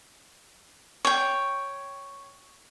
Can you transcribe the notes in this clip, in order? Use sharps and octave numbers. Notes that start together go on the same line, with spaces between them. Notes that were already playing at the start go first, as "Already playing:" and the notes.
C#5 G5